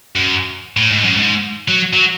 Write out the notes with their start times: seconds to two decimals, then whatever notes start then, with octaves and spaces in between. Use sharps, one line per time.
0.15 F#2
0.77 A2
0.91 G#2
1.04 F#2
1.17 G#2
1.68 F#3
1.93 F#3